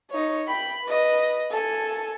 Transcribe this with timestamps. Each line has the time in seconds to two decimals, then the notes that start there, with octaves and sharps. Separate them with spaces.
0.11 D#4 C#5
0.47 G5 B5
0.84 B4 D#5
1.51 A4 G#5